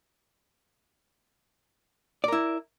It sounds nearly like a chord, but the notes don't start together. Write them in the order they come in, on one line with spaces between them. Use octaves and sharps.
D5 A#4 E4